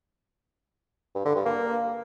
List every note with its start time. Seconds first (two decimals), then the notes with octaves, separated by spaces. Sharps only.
1.15 G2
1.25 D3
1.35 G2
1.46 A#3